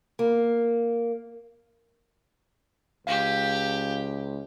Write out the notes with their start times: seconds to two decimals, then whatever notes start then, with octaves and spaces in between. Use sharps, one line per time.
0.19 A#3
3.07 C#2 G4 F5